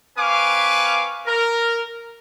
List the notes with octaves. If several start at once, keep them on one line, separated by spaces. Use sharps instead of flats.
C4 B4 F5 G#5 C#6 D6
A#4